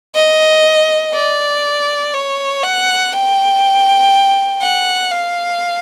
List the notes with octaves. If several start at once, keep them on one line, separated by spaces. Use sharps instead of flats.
D#5
D5
C#5
F#5
G5
F#5
F5